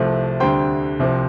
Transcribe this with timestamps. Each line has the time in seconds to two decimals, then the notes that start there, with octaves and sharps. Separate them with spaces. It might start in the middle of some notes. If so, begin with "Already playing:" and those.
Already playing: C2 C3 F3 A3 C4
0.40 D2 D3 G3 C4 G5 C6
0.99 C2 C3 F3 C4